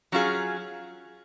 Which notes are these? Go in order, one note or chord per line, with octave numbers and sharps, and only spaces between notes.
F#3 C#4 F4 G#4